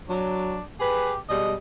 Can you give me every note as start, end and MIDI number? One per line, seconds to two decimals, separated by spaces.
0.09 0.59 54
0.09 0.63 62
0.80 1.19 67
0.80 1.13 68
0.80 1.13 71
1.29 1.55 47
1.29 1.55 55
1.29 1.55 56
1.29 1.54 75